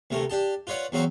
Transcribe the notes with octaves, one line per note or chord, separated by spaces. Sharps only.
D2 C3 A3 A#4
D4 G4 A5
F4 B4 C#5 D5 F#5
E2 F#3 C4 F#4 F5 C#6